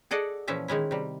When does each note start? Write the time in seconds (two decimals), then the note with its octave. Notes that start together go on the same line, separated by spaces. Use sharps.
0.11 G#4 A4 D5 D#5 F#5
0.47 A#2 E3 F3 C#4 E5 A5
0.68 D#3 G#3 C#4 E4
0.91 C3 G3